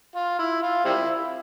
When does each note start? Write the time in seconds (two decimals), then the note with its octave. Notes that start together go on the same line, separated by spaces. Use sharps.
0.16 F4
0.39 E4
0.62 F4
0.85 G3 C4 E4